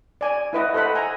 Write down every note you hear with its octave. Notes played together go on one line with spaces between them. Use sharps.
D5 G#5
E4 B4 D#5 F#5
A4 C5 D#5 F#5 B5
G#5 A#5